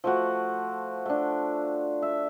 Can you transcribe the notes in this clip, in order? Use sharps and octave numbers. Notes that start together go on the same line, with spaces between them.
F3 A3 F#4
A3 D4
E5